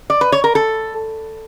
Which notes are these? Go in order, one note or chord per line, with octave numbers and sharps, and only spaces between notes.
D5
B4
C#5
A#4
A4